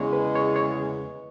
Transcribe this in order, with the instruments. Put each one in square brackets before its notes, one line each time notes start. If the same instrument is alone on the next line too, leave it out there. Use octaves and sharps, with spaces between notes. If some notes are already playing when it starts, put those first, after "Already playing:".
Already playing: [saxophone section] E2 C#3 G#3 [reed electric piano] C#5 D#5
[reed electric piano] B4
C#5
C#5